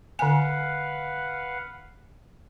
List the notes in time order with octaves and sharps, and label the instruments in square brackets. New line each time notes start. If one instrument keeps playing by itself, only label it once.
[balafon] D3 G#5 [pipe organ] B4 F5 F#5